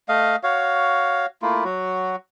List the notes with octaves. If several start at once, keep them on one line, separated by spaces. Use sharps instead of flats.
A3 D#5 F5
F#4 C#5 F5
A3 A#3 E4 F4
F#3 F#4